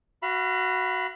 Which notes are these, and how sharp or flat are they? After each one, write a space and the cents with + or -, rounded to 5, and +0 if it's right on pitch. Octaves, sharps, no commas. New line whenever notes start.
F#4 +0 F5 -40 B5 +0